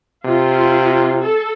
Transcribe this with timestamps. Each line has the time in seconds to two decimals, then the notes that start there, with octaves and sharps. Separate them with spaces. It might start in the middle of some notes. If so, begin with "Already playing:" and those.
0.24 C3 F4
1.19 A4